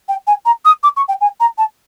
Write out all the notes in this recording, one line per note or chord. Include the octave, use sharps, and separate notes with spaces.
G5
G#5
A#5
D#6
D6
C#6
G5
G#5
A#5
A5